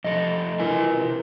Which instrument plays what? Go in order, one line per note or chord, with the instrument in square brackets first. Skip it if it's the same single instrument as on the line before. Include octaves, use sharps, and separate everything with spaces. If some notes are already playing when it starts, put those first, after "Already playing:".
[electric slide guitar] F2 C3 A4 [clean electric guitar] D#5
[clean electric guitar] E4 A#4 B4 [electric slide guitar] F4 G#5
[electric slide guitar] C3